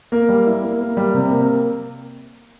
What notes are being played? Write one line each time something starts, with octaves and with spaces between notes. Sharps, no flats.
A#3
G3
E4
A#3
A#3
G3
C3
A#3